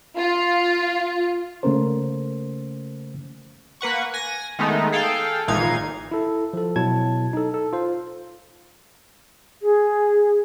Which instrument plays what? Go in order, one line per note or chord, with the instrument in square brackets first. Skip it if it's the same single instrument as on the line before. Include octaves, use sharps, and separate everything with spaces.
[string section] F4
[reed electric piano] C#3 A3 A#3 C#4 A#4 C5
[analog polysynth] A#3 B4 F#5 C#6
G#5 A#6
D#3 G#3 A3 B3 D#4
G#4 A4 F5 G5
G#1 A#2 E3 D#4 F5 G#6
[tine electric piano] E4 A4
F3 A4
B2 F#3 E4 A5 G#6
D#4 A4
A4
F4 C5
[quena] G#4